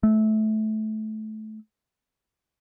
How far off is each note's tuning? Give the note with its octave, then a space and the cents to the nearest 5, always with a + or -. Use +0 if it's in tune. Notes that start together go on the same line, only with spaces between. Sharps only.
A3 -20